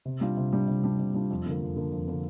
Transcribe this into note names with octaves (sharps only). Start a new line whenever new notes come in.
C3
G3 D4 F4
C3
G3 D4 F4
C3
G3 D4 F4
C3
G3 D4 F4
F2
D3 A#3
F2
D3 A#3
F2
D3 A#3